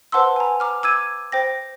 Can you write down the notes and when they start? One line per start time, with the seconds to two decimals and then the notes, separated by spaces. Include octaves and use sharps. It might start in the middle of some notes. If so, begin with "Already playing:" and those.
0.12 B4 C5 F#5 A5 C6 E6
0.36 G#5 A#5
0.60 A#5 D6 F6
0.83 D6 E6 G#6 D#7
1.32 C5 G5 A#6